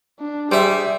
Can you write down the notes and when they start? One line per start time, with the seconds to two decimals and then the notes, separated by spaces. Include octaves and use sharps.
0.19 D4
0.51 G3 G#4 C5 E5